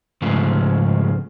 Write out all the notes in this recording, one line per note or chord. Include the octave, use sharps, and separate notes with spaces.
G#2 C#3 F3 A3